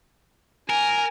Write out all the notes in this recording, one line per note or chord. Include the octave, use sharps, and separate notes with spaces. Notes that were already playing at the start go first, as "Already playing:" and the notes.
A#4 G#5